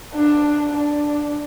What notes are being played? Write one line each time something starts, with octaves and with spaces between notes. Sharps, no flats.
D4
D4